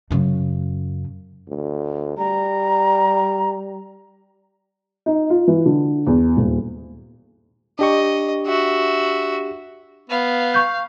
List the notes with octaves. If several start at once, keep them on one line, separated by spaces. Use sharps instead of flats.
F#2 C#3
D2
G3 A#5
D#4
F4
E3
D3
E2
D#1
D4 G4 D#5 C#6
F#4 E5
B3 F5
C#6 G6